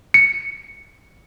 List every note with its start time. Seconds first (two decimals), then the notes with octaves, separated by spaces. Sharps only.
0.14 C#7